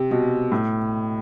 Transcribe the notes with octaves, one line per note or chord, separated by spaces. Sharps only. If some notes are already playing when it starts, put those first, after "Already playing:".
Already playing: C3
B2
A2